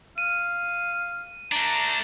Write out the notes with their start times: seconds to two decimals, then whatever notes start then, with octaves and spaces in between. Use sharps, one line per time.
0.18 F5 D#7
1.52 A3 D4 A#5